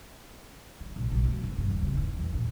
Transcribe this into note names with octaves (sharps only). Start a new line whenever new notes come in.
D3
A#1
B1
F1
F2
G2
D#2
C3
E3
E2
A#2